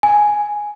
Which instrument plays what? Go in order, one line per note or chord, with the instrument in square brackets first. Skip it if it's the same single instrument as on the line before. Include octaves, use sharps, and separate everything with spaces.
[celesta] G#5